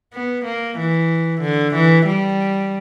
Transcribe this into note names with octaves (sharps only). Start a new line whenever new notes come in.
B3
A#3
E3
D3
E3
G3